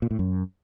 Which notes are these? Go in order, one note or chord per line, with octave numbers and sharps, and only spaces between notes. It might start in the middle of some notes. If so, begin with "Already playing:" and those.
A#2
A2
F#2